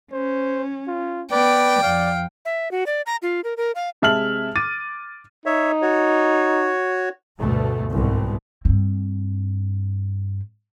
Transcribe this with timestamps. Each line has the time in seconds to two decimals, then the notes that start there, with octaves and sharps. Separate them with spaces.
0.12 C#4 C5
0.87 F4
1.32 B3 B4 D5 G5
1.83 F2 D5 F5
2.45 E5
2.71 F#4
2.87 D5
3.06 A#5
3.22 F4
3.44 A#4
3.57 A#4
3.75 F5
4.02 C3 G#3 E5 A5 F6 F#7
4.55 D6 A6 D#7
5.46 D#4 C#5 E5
5.82 F#4 C#5
7.38 D2 G2 B2 A3
7.92 C2 G#2 B2
8.65 G2 C4